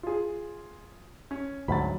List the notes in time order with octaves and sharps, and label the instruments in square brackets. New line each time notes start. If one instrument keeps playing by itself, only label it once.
[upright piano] F4 G#4
C#4
[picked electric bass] D2 G#2 F#3 [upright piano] B5 A6